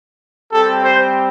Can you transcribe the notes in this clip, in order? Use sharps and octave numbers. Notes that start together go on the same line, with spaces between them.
G3 C4 G4 A4
C5